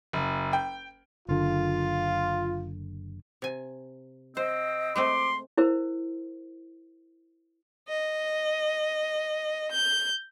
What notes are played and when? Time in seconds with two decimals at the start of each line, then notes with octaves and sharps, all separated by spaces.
0.13 F#1
0.53 G5
1.28 F#1 D3 F4
3.42 C3 G#5
4.37 C4 C5 D#5
4.96 G#3 A3 C4 C6 D6
5.57 E4 A#4 C5
7.88 D#5
9.70 G6